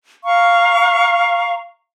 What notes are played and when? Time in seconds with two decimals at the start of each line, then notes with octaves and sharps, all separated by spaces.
0.25 F5 A#5 C#6